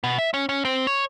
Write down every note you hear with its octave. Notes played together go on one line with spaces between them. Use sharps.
B2
E5
C#4
C#4
C4
C#5